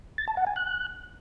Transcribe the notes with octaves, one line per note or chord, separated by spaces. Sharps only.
A6
A5
F#5
G#5
F#6